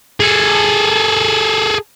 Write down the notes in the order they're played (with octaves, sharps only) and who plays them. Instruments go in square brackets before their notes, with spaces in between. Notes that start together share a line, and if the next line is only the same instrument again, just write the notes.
[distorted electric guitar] G#4 A4